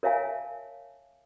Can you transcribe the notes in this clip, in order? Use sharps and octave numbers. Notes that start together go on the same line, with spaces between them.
A#4 C#5 E5 F5 G#5 A5